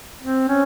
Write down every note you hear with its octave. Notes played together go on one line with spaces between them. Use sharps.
C4
C#4